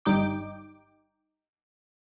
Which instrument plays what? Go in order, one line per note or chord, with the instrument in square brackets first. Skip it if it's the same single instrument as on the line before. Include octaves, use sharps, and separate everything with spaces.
[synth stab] G1 G2 G3 D#4 G5 D6